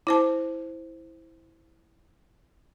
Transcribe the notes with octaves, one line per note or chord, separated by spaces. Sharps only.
E4 C5 A5